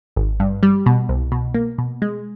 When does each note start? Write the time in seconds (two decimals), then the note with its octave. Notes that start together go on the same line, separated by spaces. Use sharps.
0.16 G#1
0.40 G2
0.63 G3
0.86 B2
1.09 C2
1.32 B2
1.54 A#3
1.78 B2
2.02 G#3